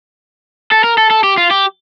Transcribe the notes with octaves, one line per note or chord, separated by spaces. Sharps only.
A4
A#4
A4
A4
G4
F4
G4